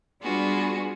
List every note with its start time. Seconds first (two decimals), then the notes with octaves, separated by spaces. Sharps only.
0.23 G3 B3 D4 F4 F#4 G#4